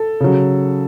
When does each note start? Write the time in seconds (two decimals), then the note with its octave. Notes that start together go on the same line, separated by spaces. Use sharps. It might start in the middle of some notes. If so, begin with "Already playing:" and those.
Already playing: A4
0.20 C#3 F#3